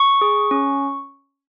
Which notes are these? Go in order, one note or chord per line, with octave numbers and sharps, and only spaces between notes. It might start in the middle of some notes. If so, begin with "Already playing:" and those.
Already playing: C#6
G#4
C#4